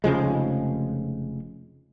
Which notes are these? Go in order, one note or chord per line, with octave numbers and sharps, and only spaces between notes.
F1 C#3 F3 G#3